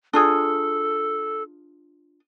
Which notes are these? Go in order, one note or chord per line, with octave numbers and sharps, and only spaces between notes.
D4 F4 G#4 A4